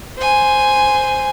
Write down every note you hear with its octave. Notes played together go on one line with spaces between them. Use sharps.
C5 G#5